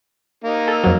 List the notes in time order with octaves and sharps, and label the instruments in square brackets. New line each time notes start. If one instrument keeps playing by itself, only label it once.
[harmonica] A#3 D#4
[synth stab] A4
F2 F#3